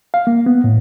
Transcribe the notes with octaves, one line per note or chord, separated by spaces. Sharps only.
F5
A#3
B3
A2